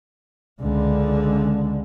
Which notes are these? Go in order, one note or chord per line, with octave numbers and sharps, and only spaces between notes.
C#2 D3